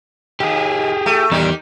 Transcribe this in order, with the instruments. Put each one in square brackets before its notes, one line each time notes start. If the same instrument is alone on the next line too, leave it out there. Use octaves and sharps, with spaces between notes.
[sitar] D#2 [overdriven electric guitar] G4 G#4
[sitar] A3
[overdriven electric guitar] E2 G3 [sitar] D#3 G4